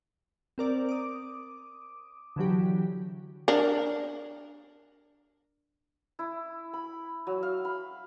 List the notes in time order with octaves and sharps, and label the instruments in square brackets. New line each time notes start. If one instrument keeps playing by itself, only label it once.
[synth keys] C4 A#4 D5
D6 D#6
D3 E3 F#3 G4
[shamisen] D4 A#4
[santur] E4
B5
F#3
F5
B5